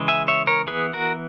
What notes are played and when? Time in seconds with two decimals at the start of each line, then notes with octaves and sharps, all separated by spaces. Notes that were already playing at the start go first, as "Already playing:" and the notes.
Already playing: C#3 E3 G#3
0.08 E5 G#5
0.28 C#5 E5
0.47 A#4 C#5
0.67 E3 B3 G#4 B4
0.93 F#4 A#4